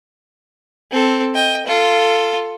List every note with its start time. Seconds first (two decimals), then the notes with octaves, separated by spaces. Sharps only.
0.91 C4 A4
1.35 D#5 G5
1.67 F4 A4